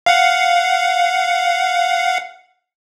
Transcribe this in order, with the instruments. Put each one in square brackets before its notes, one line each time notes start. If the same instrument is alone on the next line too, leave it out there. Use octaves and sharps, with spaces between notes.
[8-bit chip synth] F5 F#5